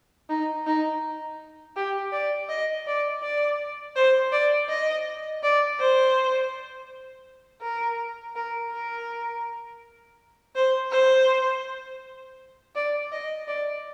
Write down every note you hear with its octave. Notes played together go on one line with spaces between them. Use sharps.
D#4
D#4
G4
D5
D#5
D5
D5
C5
D5
D#5
D5
C5
A#4
A#4
A#4
C5
C5
D5
D#5
D5